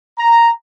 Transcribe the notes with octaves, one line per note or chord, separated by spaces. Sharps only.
A#5